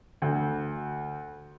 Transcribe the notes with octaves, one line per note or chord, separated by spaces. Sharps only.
D2